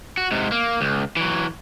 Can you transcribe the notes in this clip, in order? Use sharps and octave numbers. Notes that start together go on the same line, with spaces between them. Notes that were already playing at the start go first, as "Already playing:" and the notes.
F#4
G#2 C3
A#3
C#2
E3 F#3